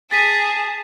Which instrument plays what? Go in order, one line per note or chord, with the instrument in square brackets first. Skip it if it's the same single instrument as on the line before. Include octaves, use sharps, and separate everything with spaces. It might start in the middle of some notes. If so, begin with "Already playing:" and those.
[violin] G#4 A5 [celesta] A6 B6 D#7